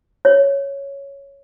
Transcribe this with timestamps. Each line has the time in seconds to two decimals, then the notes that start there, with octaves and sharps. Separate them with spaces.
0.25 C#5